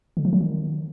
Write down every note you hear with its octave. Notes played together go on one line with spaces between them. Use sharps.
D3
F3
F#3
D#3